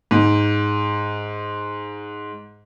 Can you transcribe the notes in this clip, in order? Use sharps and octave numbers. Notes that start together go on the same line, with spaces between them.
G#2